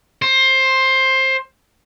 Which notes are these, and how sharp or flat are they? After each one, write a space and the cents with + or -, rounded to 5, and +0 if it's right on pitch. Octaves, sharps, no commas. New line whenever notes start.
C5 +15